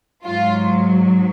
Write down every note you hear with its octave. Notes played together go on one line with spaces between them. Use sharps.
G#2 F#3 F4